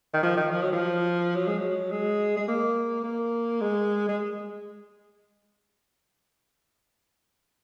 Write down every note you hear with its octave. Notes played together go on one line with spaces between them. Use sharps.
D#3
F3
D#3
F3
F#3
F3
F#3
G#3
F#3
G#3
G#3
A#3
A#3
G#3
G#3